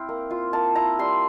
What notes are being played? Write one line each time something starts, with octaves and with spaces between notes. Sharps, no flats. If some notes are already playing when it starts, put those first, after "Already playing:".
Already playing: C4 E4 F5 G5
A#3
F4
A#3 A5
E4 A#5
G3 C6